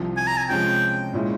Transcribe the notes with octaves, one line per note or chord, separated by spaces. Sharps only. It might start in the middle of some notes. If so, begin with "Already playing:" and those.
Already playing: C2 C3 F3
G#5
A#5
G#5
C3 F3 G#3 C#4 G5
A#2 G#3 C#4 E4